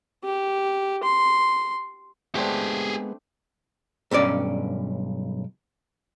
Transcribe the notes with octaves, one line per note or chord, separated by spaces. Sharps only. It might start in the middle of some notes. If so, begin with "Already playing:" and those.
G4
C6
G#3 A3 B3 C4 D4 G4 G#4
B1 G2 C#4 D5